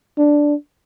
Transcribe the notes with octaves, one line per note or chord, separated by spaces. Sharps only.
D4